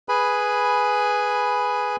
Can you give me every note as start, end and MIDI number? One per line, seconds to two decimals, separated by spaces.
0.09 1.96 68
0.09 1.96 71
0.09 1.96 80
0.09 1.96 83